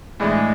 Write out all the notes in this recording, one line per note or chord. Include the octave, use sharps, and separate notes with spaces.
A2 E3 G#3 A3 D4